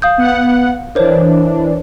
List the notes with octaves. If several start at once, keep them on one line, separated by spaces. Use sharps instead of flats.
F5 D#6 G6
B3 F#5
E3 D4 A#4 C5 C#5